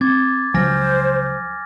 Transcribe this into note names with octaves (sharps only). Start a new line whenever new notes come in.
C4 D6 G#6 A6
C#2 F3 F#3 C5 G#5 F6 A#6